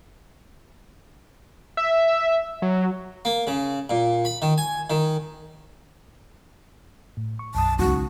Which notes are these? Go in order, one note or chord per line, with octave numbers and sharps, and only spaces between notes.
E5
F#3
A#3
C#3
A#2
B5
D#3
G#5
D#3
A2
C#6
B1 F#2 A5 D#6
C#2 D#4 F#4